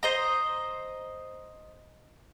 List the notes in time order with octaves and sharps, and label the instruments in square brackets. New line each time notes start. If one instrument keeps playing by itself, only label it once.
[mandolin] C5 D#5 A#5